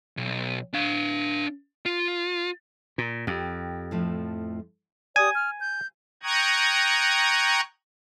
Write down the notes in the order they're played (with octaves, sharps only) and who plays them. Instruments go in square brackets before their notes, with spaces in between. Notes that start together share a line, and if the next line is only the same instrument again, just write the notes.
[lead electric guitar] B1
D4 F5
F4
[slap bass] A#2
[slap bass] F2 [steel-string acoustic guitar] G4
[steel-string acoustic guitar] A2 F3 A3
[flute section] G4 D5 D#6 [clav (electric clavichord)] G#5
[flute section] F6
G6
[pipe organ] G5 A#5 C#6 D#6 F#6 G#6